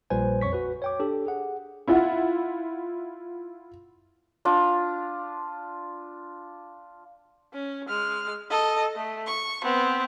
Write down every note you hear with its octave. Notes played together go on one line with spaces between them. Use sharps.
A#1 A#2 G3 B4 C5 G#5
F2 C#5 C#6 B6
F#4 B4
C#5 G5 D6
D4 G4 A4
G#4 F#5
E4 F4 E5 F#5
D4 F4
C#4
G#3 F6
A4 D#5
A3
C#6
B3 C4